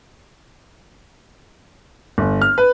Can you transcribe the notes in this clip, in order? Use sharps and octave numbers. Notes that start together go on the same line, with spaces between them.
G1
F6
B4